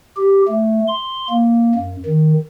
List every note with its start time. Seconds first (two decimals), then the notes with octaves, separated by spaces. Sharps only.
0.17 G4
0.48 A3
0.88 C6
1.30 A#3
1.75 F#2
2.06 D#3